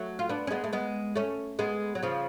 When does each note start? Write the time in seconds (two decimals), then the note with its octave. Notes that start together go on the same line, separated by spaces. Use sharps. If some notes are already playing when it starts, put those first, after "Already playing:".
Already playing: F#3 A3
0.19 F4
0.29 B3 D4
0.47 C#4
0.51 G#3 B3
0.64 A3
0.73 G#3 B3
1.15 A3 C#4
1.59 G#3 B3
1.95 F#3
2.03 C#3 F3